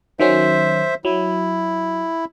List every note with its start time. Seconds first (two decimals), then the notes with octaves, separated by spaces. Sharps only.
0.20 D#3 F#3 C#4 C5 E5
1.05 F#3 E4